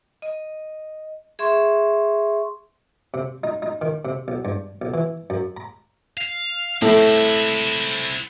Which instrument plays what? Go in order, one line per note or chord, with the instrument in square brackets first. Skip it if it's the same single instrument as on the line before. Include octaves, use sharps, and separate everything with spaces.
[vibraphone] D#5
G#4 E5 C6 C#6
[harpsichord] C3
D#4
D#4
D#3
C3
B1
G2
B1
E3
F#2
A#5
[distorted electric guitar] F5
[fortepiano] A2 [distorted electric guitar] C4 E4